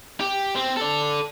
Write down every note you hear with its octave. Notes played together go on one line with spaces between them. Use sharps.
G4
C4
A4 D5